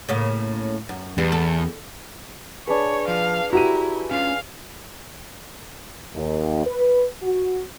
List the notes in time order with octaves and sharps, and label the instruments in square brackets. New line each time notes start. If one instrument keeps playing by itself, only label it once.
[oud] A2 C#3 A#3
F#2
[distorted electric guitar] E2 [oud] G3 B4
[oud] A4
[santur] D4 G#4 B4 [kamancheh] C#5
[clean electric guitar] F3 [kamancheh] F5
[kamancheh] E4 [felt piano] F#4 G4 D#7 [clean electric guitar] A#5
[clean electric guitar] C#4 D4 F4 [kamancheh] F5
[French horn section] D#2
B4
F#4